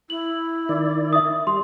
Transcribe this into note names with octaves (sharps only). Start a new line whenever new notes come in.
E4 F#7
D#3 D5
E5 D#6
G3 C6